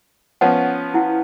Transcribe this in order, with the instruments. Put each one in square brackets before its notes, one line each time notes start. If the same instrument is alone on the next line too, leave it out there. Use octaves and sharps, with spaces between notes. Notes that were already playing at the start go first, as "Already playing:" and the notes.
[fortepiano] F3 B3 C#4 [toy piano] F#5
[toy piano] E4 F#5